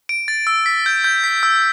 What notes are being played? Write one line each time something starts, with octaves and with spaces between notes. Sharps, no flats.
D7
A6
E6
B6
G6
G6
B6
E6